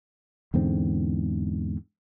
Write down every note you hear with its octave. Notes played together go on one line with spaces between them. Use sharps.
E2 G#2 D3 C4